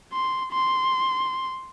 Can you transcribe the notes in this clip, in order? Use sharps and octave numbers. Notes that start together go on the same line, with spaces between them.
C6
C6